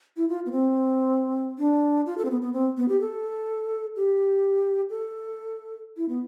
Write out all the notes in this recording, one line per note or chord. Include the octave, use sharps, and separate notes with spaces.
E4
F4
B3
C4
D4
F4
A4
C4
B3
B3
C4
B3
G4
A4
G4
A4
E4
B3